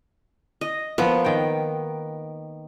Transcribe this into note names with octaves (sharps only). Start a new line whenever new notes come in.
D#5
F3 A#3 B3
D#3 G5